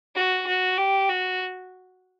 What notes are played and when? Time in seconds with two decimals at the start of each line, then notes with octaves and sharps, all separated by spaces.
0.16 F#4
0.47 F#4
0.78 G4
1.09 F#4